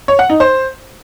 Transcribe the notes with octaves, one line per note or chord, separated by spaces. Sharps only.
C#5
F#5
D#4
C5